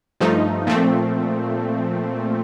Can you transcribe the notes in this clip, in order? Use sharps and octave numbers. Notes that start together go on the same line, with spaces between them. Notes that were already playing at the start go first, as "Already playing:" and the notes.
G2 F3 A3 D#4
A#2 F3 A3 C4